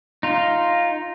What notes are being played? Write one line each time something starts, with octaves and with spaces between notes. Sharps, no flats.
D#4 F4